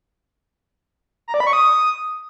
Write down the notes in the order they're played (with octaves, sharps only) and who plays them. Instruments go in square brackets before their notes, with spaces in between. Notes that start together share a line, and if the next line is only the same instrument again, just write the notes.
[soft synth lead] A#5
D5
B5
C#6
D#6